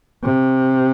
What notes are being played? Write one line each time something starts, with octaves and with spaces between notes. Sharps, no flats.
C3